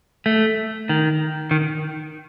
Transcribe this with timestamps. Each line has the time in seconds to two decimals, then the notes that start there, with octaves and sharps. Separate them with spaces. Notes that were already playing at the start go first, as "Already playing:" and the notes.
0.26 A3
0.89 D#3
1.51 D#3